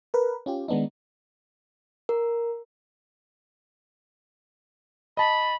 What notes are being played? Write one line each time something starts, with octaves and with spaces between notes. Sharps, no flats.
A#4 B4
C#4 F4 G4
D#3 G#3 B3 D4 D#4
A#4
D#5 A5 B5